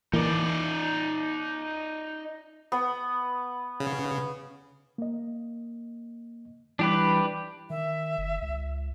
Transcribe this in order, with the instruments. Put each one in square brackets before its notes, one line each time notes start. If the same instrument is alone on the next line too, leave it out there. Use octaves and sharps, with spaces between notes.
[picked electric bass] E3 A#3 [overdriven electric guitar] D#4 D5
[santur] B3
[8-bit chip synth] C#3
[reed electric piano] A#3 D#5
[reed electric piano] E3 G3 E4 [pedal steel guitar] D4 G4 B4
[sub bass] D#3 [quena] E5
[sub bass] F#1
C#2